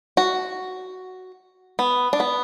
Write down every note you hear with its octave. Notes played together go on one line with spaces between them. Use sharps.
F#4
B3
D4
B3